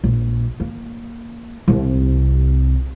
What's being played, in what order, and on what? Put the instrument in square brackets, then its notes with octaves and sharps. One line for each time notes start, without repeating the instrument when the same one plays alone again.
[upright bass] A#1
A#3
C2 C3